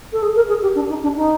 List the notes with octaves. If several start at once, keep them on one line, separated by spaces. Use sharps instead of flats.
A4
G#4
A#4
G#4
G4
D4
D#4
D4
D#4